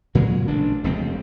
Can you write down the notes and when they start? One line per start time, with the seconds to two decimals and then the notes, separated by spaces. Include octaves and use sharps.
0.15 A#2 C#3 F#3 G#3
0.48 A1 D4
0.84 F1 C#2 C4